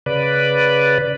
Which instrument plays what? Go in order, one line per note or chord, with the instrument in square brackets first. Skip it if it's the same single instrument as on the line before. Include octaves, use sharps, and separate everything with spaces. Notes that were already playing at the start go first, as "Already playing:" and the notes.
[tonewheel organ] C#3 B4 D5